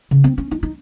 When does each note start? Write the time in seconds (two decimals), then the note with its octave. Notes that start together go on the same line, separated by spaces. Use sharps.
0.11 C#3
0.24 C4
0.38 C#4
0.51 D#4
0.63 D#4